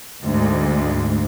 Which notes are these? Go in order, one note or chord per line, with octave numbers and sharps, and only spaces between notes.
D2 G#2